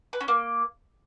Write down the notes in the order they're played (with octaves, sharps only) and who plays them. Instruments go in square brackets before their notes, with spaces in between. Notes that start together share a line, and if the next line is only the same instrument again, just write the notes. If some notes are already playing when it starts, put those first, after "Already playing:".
[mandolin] B4
C#4
A#3